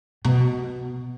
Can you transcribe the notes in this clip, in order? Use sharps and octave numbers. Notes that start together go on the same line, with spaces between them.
B2